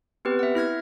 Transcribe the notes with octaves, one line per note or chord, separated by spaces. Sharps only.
B3 C4 G4 B4
E5 F#5
E4 F6 G#6 A#6